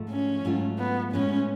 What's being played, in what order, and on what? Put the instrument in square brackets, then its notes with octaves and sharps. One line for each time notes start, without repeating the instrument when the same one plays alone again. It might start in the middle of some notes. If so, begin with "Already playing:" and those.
Already playing: [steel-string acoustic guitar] G#2 F3 A3
[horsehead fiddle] C#4
[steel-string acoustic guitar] G#2 F#3 A3 F4
[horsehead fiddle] B3
[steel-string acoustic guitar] A2 G#3 B3 [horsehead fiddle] C#4